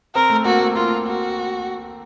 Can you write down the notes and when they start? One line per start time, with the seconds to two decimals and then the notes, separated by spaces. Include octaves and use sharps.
0.15 C4 A#4
0.30 A3
0.45 A#3 F#4
0.60 A3
0.76 A#3 F4
1.07 F#4